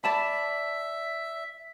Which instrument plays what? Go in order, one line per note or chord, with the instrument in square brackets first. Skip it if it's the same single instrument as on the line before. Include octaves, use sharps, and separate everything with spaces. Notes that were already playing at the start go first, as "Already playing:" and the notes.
[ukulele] D5 A5 B5 [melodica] E5